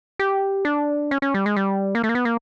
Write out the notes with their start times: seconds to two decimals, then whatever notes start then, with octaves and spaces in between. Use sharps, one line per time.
0.19 G4
0.65 D4
1.11 C#4
1.22 C#4
1.34 G3
1.46 G#3
1.56 G3
1.95 A#3
2.04 A3
2.09 A#3
2.15 B3
2.25 A#3